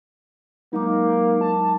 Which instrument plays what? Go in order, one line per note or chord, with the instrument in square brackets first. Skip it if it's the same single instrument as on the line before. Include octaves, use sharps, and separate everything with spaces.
[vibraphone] F#3 G#3 D6 [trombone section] A#3 [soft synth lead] D#4
[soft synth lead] A5